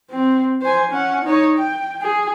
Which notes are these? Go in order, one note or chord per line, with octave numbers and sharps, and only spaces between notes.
C4
C5 G#5
C#4 F#5
D#4 C#5
G5
G#4